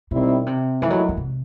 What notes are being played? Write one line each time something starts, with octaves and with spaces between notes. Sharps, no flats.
B2 D#3 G3 C4 E4
C3
D#2 D#3 E3 A3 E4
F#3
E3
C3